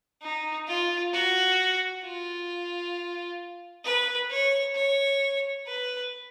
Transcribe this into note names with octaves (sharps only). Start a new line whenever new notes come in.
D#4
F4
F#4
F4
B4
C#5
C#5
B4